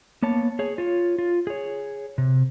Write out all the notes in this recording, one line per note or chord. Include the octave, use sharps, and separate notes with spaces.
A#3 B3 C#5 A5
G#4 C#5
F4 C#5
F4
G#4 C#5
C3